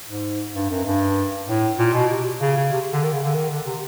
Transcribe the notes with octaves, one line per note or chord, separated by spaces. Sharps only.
G#2
G2
F#2
G2
A2
A#2
B2
C3
C#3
C#3
C3
D3
D#3
C#3
D3
D#3
D3
C3